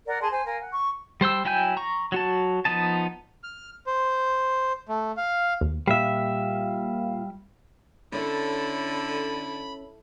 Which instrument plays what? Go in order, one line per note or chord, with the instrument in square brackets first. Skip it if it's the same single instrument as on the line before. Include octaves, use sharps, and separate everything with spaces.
[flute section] A#4 D5 F#5
G#4 A5 C6
C5 G#5
A#4 F5 G#5
F#5
C#6
[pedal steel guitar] G3 C5 G5 E6
F#3 E4 G5 G#5 G6
A#5 C#6
F#3 F#4 A5
F3 B3 D#4 A5
[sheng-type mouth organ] F6
C5
A3
F5
[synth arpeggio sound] D#2
[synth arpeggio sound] A#2 F5 [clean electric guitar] G3 E5
[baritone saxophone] D3 [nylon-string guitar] C#4 C5 C#5 [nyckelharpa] E4 A4 [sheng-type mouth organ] B5